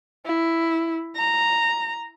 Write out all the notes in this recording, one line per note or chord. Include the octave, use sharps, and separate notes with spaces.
E4
A#5